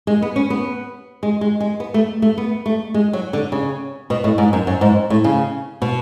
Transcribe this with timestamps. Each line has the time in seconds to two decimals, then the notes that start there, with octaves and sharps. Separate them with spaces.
0.07 G#3
0.22 B3
0.36 C#4
0.50 B3
1.23 G#3
1.41 G#3
1.60 G#3
1.80 B3
1.94 A3
2.22 A3
2.38 B3
2.66 A3
2.94 G#3
3.13 F#3
3.33 D3
3.52 C#3
4.10 B2
4.24 A2
4.38 G#2
4.53 F#2
4.67 F#2
4.81 G#2
5.10 A2
5.24 C#3
5.82 B2